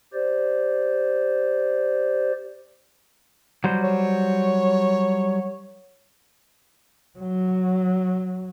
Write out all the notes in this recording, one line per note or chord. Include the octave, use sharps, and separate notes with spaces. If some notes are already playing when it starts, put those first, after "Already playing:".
G4 C5 D5
F#3 G3 C5
C#5
F#3